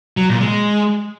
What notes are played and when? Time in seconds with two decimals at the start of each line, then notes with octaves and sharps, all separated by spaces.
0.17 F#3
0.29 A#2
0.41 G#3